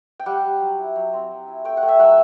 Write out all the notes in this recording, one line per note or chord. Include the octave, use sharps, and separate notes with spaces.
G5
G3 F#5
G3
F#3
E4
F#3
C4
F#3
E4
A3 G5
F#5
A3
E5
F#3 F#5